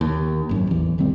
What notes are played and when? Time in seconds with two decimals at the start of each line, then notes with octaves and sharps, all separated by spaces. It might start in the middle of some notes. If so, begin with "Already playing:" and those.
0.01 D#2
0.49 G#1 F#2
0.67 A1 E2
0.98 G1 D#3 G3 C4